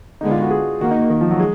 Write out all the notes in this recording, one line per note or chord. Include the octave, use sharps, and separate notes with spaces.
D3 G#3 B3 D#4
F4
F#4
G#4
D#3 A#3 F#4
D#4
D#3
F3
F#3
G#3